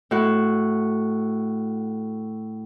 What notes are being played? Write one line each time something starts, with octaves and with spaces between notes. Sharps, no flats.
A2 F#4